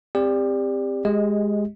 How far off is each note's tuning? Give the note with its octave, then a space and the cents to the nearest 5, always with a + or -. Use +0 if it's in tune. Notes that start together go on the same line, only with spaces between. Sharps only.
C4 +0 G4 +30 D5 +0
G#3 +0 G4 +0 D#5 +15